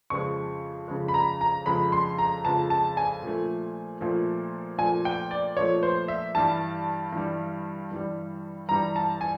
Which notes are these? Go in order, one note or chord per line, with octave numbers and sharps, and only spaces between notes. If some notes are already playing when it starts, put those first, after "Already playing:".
F2 C#3 F3 G#3 C#6
F2 C#3 F3 G#3
B5
A#5
A#5
F2 C#3 F3 G#3 B5
C6
A#5
F2 C#3 F3 G#3 A5
A5
G#5
A#2 F3 A3
A#2 F3 A3
A#2 F3 A3 G#5
G5
D5
A#2 F3 A3 C#5
C5
E5
G2 E3 G3 A5
G2 E3 G3
G2 E3 G3
G2 E3 G3 A#5
A5
G#5